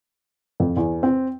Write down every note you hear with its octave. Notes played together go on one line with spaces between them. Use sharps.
F2
E2
C4